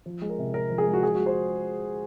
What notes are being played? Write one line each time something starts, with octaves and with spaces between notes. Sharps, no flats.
F3
G#3
A#4
C3
C3 A#4
F3
G#4
G#3
F#4
F3 G#4
G#3 F#4
C5